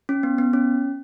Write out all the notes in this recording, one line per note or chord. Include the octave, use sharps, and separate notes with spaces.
C#4
B3
B3
C#4